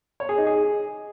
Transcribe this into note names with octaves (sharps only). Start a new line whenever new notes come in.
C#5
G#4
D#4
G#4